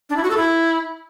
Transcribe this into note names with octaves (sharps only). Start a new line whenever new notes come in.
D4
E4
F#4
A4
E4